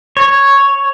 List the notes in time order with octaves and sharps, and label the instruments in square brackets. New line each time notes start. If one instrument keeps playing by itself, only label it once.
[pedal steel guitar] C#5